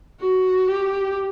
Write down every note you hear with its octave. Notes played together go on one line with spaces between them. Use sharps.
F#4
G4